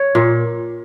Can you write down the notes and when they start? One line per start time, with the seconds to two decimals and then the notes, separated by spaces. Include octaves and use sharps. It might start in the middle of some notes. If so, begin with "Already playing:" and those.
Already playing: C#5
0.15 A#2